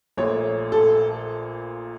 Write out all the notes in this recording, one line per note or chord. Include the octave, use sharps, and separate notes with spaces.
A#1 A#2 A3 C#5
A4